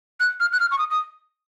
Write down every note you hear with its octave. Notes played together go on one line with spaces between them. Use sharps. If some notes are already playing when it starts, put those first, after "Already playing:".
F#6
F6
F#6
F6
C#6
D#6
D#6